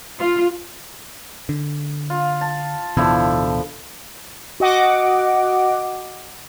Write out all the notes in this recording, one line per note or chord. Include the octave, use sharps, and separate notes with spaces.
F4
D3
F4
A5
D1 B2 D3 E3 F3 E4
F#4 D#5 F#5 D6